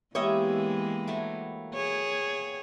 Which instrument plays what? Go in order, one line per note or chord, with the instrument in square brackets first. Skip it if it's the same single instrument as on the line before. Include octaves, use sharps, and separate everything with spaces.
[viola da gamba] E3 G#3 [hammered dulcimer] A#3 B3 G4 [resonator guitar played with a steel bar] C#5 D#5 E5
[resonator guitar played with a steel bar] F#3 A3
[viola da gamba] G#4 C#5